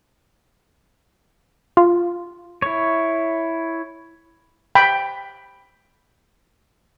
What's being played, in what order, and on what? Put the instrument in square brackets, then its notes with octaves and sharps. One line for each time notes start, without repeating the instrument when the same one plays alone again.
[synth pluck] F4
[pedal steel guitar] E4 C#5
[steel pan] G5 B5